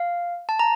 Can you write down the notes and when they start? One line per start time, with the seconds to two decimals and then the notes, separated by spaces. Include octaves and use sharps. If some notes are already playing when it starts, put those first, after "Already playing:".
Already playing: F5
0.49 A5
0.59 A#5